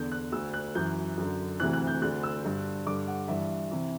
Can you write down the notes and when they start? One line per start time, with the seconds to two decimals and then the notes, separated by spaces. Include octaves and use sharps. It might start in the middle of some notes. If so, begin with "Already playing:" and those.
Already playing: E2 D3 G6
0.12 F#6
0.32 D2 D3 E6
0.54 F#6
0.75 F#2 E3 G6
1.18 F#2 D3
1.60 D2 C3 E3 F#6
1.73 F#6
1.87 G6
2.02 D2 D3 F#6
2.23 E6
2.44 G2 D3
2.87 G2 D3 D6
3.08 F#5
3.28 G2 E3 E5
3.71 C3 E3